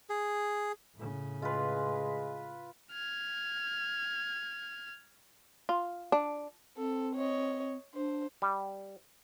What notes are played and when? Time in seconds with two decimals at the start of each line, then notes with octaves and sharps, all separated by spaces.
0.10 G#4
0.95 A2 C#3
1.42 G#3 F4 B4
2.92 F6 G#6
5.69 F4
6.12 D4
6.77 C4 A4
7.16 C#5 D#5
7.94 D4 C5
8.42 G3